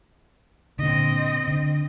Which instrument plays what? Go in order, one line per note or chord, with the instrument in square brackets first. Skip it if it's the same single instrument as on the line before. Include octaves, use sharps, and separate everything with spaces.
[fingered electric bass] A#2 D3 [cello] C4 D#5
[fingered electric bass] D3